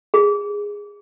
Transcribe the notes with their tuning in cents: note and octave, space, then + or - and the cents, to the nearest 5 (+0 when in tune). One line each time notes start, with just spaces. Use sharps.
G#4 -15